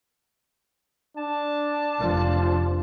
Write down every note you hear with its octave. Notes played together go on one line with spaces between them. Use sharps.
D4 A5
F1 F3